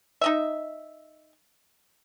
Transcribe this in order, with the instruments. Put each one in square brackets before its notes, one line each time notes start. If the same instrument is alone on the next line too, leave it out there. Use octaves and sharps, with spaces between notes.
[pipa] D#4 D#5 E5